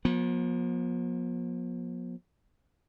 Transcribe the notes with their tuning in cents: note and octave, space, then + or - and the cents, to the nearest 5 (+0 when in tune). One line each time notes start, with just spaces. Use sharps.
F3 +40 B3 -40